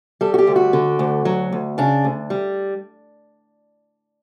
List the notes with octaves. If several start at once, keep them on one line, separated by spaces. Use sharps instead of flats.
G3 A4
F#4
G4
D2
F#4
D3
D2
F#3
D2
C#3 D4
D2
G3